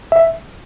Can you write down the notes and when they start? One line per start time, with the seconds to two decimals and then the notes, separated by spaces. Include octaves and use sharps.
0.12 E5